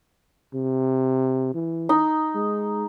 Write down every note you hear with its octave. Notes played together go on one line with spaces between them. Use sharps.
C3
E3
D#4
G#3